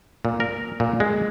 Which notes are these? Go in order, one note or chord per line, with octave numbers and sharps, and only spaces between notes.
A#2
A#4
A#2
G#3